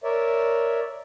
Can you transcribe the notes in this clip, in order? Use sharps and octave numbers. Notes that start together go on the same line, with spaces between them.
A#4 C#5 D5 E5